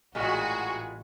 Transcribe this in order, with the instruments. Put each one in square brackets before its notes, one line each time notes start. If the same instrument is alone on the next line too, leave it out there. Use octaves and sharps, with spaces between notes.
[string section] A1 F#4 G#4 [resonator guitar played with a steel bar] A#2 G3 G#3